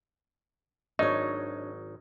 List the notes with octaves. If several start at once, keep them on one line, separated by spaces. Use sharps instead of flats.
G#1 F#3 D4 D#4 C#5 D#5